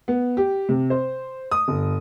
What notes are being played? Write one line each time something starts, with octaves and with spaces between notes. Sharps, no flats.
B3
G4
C3
C5
D#6
G1